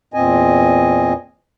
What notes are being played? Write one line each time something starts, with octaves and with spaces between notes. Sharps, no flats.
E2 A#2 C4 D#5 G#5